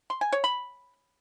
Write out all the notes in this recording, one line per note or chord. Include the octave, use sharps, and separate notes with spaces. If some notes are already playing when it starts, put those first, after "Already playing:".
C6
G#5
C#5
B5